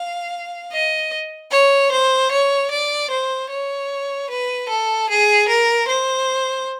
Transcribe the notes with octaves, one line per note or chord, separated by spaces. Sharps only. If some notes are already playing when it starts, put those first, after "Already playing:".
Already playing: F5
D#5
C#5
C5
C#5
D5
C5
C#5
B4
A4
G#4
A#4
C5